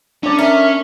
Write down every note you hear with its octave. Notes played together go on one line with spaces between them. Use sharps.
C#4 D4 D5
A#4 E5